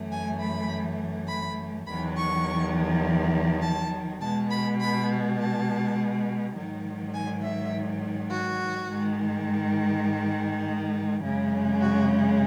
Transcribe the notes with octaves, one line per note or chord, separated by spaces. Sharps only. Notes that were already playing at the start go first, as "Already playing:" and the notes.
Already playing: F#2 E3 A3
G#5
B5
B5
E2 D#3 F#3 B5
C#6
A5
B2 G#3 A5
B5
B5
A5
G#2 D#3 F#3
G#5
E5
F#4
G#2 D#3 G#3
F#2 C#3 G#3
F#4